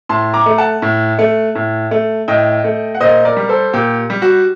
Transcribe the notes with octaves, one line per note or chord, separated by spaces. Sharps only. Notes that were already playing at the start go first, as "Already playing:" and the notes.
A2 A5 C6
A#5 D6
A3
F#5 A5
A2
A3
A2
A3
A2 D#5 G5
A3
F#5
A#2 C5 D#5
A#4 D5
G3
A4 C5
A#2 G4
G3
F#4